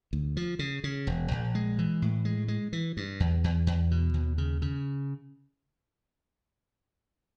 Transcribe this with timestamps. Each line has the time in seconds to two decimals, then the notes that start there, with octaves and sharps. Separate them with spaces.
0.13 D2
0.37 F3
0.59 C#3
0.84 C#3
1.07 E1
1.31 A#1
1.55 G#3
1.79 E3
2.02 A2
2.25 G#3
2.48 G#3
2.73 E3
2.97 G2
3.20 E2
3.44 E2
3.67 E2
3.91 B2
4.14 D#2
4.38 C#3
4.62 C#3